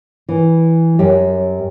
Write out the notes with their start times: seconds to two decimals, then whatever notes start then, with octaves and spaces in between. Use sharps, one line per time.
0.29 E3
0.99 F#2 G4